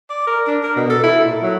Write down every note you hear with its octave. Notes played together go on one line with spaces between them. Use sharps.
D5
A#4
D4
A#4
B2
A4
E4
A#2
F#3